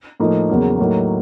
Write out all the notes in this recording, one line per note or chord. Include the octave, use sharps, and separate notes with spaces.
A2 F3 A#3 D#4
E2 C#3 F#3 A#3
A2 F#3 A#3 D#4